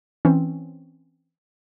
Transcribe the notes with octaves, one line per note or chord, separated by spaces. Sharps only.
E3 C4 C#4